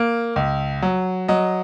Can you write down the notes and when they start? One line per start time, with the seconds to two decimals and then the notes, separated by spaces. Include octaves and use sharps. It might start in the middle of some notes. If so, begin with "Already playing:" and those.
Already playing: A#3
0.36 C#2
0.82 F#3
1.28 F#3 D#5